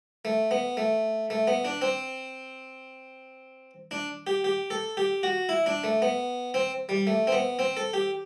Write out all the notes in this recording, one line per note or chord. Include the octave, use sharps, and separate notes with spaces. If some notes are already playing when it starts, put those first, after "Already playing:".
A3
B3
A3
A3
B3
D4
C4
D4
G4
G4
A4
G4
F#4
E4
D4
A3
B3
C4
G3
A3
C4
B3
C4
A4
G4